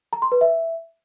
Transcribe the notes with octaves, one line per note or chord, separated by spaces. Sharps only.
A#5
C6
B4
E5